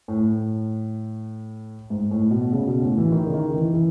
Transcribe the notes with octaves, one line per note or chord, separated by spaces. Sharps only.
A2
G#2
A2
B2
C#3
B2
A2
E3
D#3
C#3
D#3
E3
E3